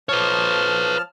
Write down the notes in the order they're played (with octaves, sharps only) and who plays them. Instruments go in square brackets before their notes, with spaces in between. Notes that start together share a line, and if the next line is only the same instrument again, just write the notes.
[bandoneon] F3 A5 F6 [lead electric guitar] B4 C#5